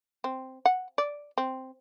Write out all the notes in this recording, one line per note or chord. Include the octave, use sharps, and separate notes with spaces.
C4
F#5
D5
C4